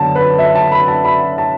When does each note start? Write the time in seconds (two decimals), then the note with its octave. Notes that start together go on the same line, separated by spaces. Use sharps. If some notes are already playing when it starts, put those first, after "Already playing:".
Already playing: F#2 D3 B3 A5
0.16 B4
0.39 E5
0.55 A5
0.72 B5
0.88 A5
1.05 B5
1.38 A5